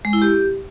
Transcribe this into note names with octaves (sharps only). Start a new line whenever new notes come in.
G#3
E4
G4